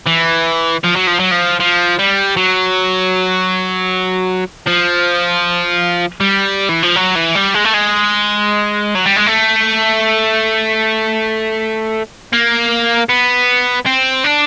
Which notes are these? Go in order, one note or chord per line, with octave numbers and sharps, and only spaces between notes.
E3
F3
F#3
F3
F#3
F3
F3
G3
F#3
F3
G3
E3
F3
F#3
E3
G3
G#3
A3
G#3
F#3
G3
G#3
A3
A#3
B3
C4
D4